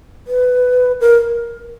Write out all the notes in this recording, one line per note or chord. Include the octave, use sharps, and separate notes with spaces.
B4
A#4